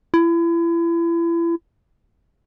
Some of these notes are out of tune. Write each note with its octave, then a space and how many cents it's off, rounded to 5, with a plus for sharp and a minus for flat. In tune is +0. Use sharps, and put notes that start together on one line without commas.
E4 +35